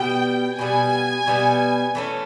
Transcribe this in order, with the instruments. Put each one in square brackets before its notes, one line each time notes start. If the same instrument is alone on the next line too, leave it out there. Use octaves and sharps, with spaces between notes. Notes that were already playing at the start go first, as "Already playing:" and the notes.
Already playing: [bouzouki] B2 G3 B3 [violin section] G5
[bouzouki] B2 G3 B3 [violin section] G#5
[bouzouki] B2 G3 B3
E3 A3 C#4